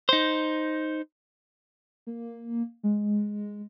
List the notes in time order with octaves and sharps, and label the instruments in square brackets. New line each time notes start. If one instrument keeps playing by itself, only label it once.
[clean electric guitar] D#4 C5
[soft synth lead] A#3
G#3